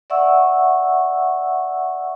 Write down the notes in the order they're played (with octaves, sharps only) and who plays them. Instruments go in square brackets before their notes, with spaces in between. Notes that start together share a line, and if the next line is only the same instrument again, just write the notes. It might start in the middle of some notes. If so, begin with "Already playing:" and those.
[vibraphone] D5 E5 F#5 C#6 E6